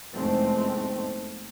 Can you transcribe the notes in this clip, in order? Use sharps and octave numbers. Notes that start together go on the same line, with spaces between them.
F1 E2 G#2 A3 C4